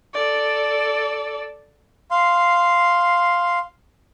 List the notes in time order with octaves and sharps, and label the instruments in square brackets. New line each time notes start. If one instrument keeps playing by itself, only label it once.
[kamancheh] A4 D5
[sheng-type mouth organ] F5 C6